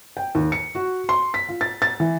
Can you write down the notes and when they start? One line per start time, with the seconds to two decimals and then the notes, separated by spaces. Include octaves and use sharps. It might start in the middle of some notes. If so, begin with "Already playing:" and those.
0.17 G5
0.35 D#2
0.52 C#7
0.75 F#4
1.09 C6
1.34 B6
1.49 F4
1.61 A6
1.82 A6
2.00 E3